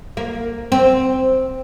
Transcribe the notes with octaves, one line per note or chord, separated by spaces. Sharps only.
A#3
C4